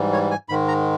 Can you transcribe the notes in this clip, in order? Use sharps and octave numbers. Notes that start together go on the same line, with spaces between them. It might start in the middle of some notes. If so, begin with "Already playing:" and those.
Already playing: G#2 E3 G3
C#5
G#5
G#2 D#3 G#3 B5
A#5